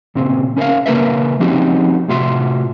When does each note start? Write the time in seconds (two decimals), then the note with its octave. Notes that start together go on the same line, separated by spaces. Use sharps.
0.15 A#2 C#3 C4
0.57 C#4 A#4 C#5 E5 F5
0.86 C#3 A#3 A#4 B4 E5
1.40 F3 C4 C#4 D#4 F#4 G4
2.08 A2 C3 F4 F#4 E5 C6